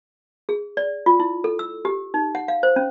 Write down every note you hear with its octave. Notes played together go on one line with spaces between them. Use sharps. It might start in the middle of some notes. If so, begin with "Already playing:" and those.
G#4
D5
F4
E4
A4
E6
G4
D#4
F#5
F5
C5
C#4